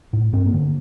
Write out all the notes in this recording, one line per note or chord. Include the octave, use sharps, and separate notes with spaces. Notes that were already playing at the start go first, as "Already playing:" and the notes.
A2
G2 C4
A#3
D3